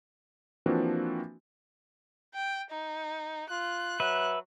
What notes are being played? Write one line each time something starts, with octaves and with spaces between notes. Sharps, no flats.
E3 F3 A#3 C4 D4 F#4
G5
D#4
F4 F#6
F#3 B4 E5